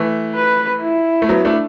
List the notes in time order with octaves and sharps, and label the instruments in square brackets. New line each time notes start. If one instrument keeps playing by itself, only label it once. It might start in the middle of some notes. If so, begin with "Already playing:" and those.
Already playing: [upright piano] E3 A3
[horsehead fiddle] B4
E4
[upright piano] A3
F#3 B3
A3 D4